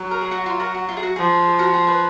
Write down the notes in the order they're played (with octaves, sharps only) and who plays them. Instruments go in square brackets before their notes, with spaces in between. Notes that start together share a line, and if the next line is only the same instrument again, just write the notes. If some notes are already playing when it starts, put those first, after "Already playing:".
Already playing: [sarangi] F#3
[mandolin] A#4
G#4
F#4
F4
F#4 A#4
F#4
F4
G#4
F#4
[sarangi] F3 [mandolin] G#4
[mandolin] F#4 A#4
G#4
G#4 B4